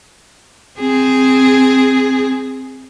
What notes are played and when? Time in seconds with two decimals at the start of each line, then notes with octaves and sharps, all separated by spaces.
0.80 C4 G#4